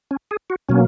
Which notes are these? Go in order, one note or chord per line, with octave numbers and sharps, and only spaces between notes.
C#4
G#4
F#4
B2 F#3 A#3 C#4